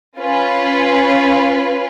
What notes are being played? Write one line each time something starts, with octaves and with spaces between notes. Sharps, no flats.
C#4 F4 B4